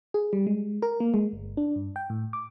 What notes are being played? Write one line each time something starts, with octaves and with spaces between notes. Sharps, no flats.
G#4
G3
G#3
A#4
A#3
G#3
G1
D4
G2
G5
A2
D6